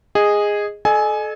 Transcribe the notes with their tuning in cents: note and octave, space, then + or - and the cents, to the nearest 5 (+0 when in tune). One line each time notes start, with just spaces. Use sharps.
G#4 -10 D#5 +0
A4 -30 D#5 -40 G#5 +15